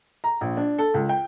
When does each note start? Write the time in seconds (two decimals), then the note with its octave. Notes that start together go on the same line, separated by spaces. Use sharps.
0.24 A#5
0.41 A#1
0.57 D4
0.78 A4
0.94 C#2
1.09 G5